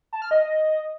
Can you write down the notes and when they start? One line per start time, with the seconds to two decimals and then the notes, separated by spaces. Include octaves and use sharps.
0.13 A5
0.22 F6
0.31 D#5